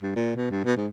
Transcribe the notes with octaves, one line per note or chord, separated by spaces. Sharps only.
G2
A#2
B2
G2
B2
G#2